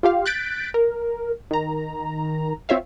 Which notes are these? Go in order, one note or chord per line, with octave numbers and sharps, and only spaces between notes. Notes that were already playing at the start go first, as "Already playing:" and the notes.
F4 G4 F5
F#6 G6 A6 B6 D7
A#4
D#3 A#5
C4 F4 C#5 E5 F5